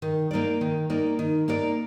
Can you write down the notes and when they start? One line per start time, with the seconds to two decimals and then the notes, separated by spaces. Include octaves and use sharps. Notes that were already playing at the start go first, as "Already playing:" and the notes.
0.02 D#3
0.31 A#3 D#4 A#4 D5
0.61 D#3
0.90 A#3 D#4 A#4 D5
1.19 D#3
1.48 A#3 D#4 A#4 D5